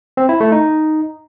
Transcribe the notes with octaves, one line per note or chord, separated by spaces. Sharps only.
C4
E4
A3
D#4